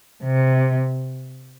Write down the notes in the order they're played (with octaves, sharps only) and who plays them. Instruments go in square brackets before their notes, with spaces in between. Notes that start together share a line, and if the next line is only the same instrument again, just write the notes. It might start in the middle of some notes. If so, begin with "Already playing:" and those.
[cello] C3